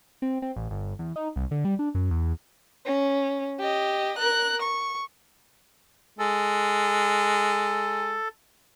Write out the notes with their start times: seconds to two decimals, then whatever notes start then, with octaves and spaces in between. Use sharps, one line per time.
0.22 C4
0.42 C4
0.56 A1
0.71 G1
0.99 E2
1.16 D#4
1.36 C2
1.51 D3
1.65 G3
1.79 D4
1.95 F#2
2.11 E2
2.86 C#4
3.59 G4 D#5
4.18 A#4 F#6
4.62 C#6
6.19 G#3 A4